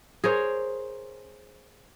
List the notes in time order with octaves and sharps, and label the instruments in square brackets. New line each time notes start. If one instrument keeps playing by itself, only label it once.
[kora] G#4 A#4 C5 C#5